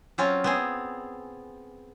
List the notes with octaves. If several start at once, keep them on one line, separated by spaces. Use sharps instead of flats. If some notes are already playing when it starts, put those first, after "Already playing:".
F#3 C4 C#4 F4
B3 C4 G#4